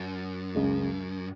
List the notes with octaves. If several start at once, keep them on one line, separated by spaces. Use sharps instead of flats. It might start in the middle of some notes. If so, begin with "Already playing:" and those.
Already playing: F#2
C#2 C#3 G#3